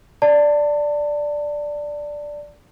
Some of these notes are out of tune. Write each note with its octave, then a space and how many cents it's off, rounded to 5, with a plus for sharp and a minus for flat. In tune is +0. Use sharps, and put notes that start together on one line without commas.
D5 +0 A5 +30